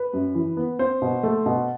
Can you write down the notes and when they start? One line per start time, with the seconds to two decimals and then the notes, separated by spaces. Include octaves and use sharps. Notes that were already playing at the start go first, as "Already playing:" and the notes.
Already playing: B4
0.13 F#2
0.35 E3
0.57 B3
0.79 C4 C5
1.02 B2
1.23 A3
1.46 B2